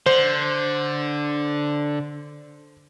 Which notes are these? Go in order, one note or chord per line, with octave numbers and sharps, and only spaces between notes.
D3 C5